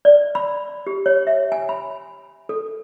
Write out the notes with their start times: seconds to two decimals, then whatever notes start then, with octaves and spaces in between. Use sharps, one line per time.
0.05 D5
0.35 B5
0.87 G4
1.06 C#5
1.27 E5
1.52 G#5
1.69 B5
2.49 A4